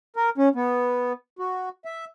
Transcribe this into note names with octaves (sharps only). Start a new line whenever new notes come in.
A#4
C#4
B3
F#4
E5